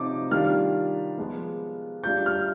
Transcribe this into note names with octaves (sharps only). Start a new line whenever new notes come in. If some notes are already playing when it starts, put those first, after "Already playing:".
Already playing: C3 F3 C4 D#4 D6
D#3 G3 D4 F4 F6
F3 G#3 B3
G3 D4 F4 G6
F6